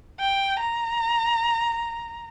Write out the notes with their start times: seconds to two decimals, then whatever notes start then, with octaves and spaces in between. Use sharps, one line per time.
0.20 G5
0.60 A#5